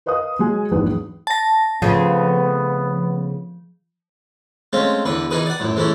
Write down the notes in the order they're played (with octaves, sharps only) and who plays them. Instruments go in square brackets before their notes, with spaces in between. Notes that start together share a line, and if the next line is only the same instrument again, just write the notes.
[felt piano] A#4 B4 D#5 F5 D#6
F#3 G#3 G#5
A#1 E2 G#2 F#3 B4
[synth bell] A5 A#6
[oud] C#3 A3 C4 [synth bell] F3 [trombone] B3
[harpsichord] G#3 A3 C4 C#4 F5
E2 D3 B4
E3 D#4 G#4 A#4 B4 D#6
D5 F#5
F#2 A2
E3 G#3 A3 C#4 E4